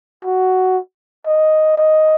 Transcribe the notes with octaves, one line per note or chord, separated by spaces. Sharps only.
F#4
D#5
D#5